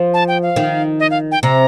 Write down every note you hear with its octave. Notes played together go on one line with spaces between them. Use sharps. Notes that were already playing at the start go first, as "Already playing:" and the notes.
Already playing: F3
A5
G5
F5
D#3
D#5
F5
G5
C3 A#5